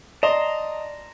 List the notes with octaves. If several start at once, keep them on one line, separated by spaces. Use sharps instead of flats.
D5 D#5 A5 A#5 C6